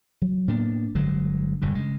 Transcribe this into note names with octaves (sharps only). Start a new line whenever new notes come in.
F#3
A2 A#3 B3 D4
G1 D3 F#3 G#3
E1 G2 D3
C#3 G#3